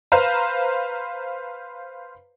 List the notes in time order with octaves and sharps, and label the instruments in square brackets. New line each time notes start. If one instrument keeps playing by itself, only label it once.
[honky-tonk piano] B4 C5 F5 A#5